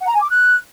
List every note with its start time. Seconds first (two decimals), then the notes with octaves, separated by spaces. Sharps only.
0.01 F#5
0.08 A#5
0.14 G#5
0.21 D6
0.28 F#6